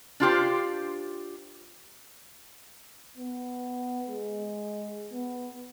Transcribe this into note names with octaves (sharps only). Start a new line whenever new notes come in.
D4 F4 G4 C5
B3
G#3
B3